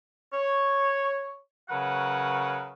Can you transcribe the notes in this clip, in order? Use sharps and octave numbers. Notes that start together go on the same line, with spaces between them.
C#5
C#3 F#3 A#4 B4 F#5